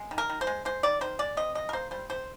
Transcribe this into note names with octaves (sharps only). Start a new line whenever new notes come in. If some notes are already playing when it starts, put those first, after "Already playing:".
Already playing: G#3
D#3
A#4
D#3
C5
G#3
G#3 C5
D#3 D5
D#3 C5
G#3 D5
C3 D#5
C3 D#5
A#4
A#3 C5
G3 C5
C3 C5